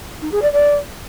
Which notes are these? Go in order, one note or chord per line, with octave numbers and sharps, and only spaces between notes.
D#4
G#4
D5
D5